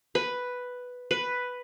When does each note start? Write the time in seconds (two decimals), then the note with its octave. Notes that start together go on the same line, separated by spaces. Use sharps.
0.15 B4
1.11 B4